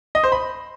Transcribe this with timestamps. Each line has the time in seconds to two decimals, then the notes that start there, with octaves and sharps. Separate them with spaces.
0.15 D#5
0.24 C5
0.32 B5